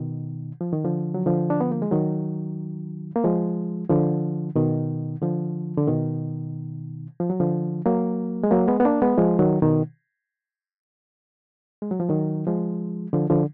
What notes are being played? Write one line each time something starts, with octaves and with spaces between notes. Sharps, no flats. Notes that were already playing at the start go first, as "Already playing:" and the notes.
Already playing: B2 D#3
F3
D#3
D3 F3
F#3
D3 F3
D4
B3
A#3
G#3
D#3 F#3
A#3
F3 G#3
D3 F3
B2 D#3
D3 F3
D3
B2 D#3
F3
F#3
D3 F3
F#3 A#3
G#3
F#3 A#3
G#3 B3
B3
A#3 D4
G#3 B3
F3 G#3
D#3 F#3
B2 D#3
G#3
F#3
F3
D#3 F#3
F3 G#3
D3 F3
D3 F3